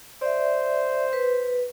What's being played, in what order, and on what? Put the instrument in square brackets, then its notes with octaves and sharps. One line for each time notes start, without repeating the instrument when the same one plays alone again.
[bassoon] C5 [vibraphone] D5 E5
[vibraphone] B4